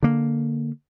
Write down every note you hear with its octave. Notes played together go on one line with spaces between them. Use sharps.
D3 A#3